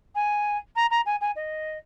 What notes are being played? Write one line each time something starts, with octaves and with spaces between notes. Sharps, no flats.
G#5
A#5
A#5
G#5
G#5
D#5